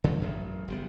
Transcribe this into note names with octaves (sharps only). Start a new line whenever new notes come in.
C#3 F#3 A3
A1 F#2 C#3
F#1 G3 B3